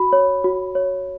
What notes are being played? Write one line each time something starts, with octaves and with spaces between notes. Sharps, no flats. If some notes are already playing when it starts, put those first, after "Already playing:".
Already playing: F#4 B5
C#5
F#4
C#5